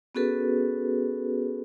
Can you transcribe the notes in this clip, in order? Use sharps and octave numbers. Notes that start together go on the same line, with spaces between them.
B3 C#4 F#4 G#4 A4 B4